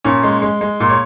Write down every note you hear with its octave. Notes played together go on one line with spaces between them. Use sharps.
A#2 C#4
G#3
G#3
G#3
A#2
C#5